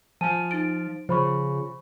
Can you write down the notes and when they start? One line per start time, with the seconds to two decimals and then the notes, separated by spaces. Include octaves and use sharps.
0.21 F3 G#5 A5 D#7
0.51 D#4 A6 D7
1.09 C#3 F3 C5 B5 C#6